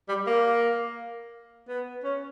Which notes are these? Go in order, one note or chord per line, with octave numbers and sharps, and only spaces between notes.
G3
A#3
B3
C#4